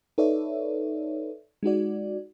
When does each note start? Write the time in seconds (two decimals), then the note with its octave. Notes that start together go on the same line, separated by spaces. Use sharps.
0.18 D#4 A4 B4 C#5 D5 E5
1.63 G#3 D#4 F#4 D5